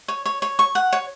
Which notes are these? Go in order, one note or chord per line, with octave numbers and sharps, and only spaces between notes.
C#5
C#5
C#5
C#6
F#5
C#5